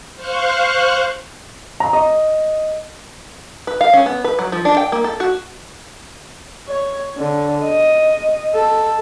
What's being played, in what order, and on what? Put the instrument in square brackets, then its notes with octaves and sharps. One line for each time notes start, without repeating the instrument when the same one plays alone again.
[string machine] C5 F5 C#6 F#6
[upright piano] A#5
D#5
[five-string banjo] B4
F5
C#4
B3
B4
F#3
F3
D4
G5
A#3
A4
F#4
[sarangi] C#5
D3
D#5
A4